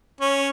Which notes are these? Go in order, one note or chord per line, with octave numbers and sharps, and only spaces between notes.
C#4